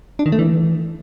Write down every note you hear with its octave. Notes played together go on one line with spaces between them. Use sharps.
D4
D#3
A3
E3